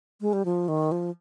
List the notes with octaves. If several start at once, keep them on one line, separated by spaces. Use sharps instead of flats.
G#3
G3
F3
D#3
F3